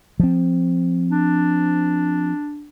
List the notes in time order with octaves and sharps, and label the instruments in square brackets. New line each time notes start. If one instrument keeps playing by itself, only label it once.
[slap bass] F3 C4
[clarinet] D4